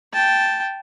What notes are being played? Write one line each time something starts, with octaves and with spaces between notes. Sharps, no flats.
G5 A5